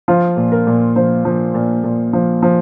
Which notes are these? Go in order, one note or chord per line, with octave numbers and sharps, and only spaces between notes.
F3 F4
A#2
A#4
A#2
F3 C5
F3
A#2
A#2
F3
F3